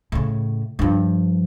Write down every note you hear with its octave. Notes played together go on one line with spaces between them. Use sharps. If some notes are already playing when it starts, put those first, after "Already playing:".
A2 C#3
G2 F3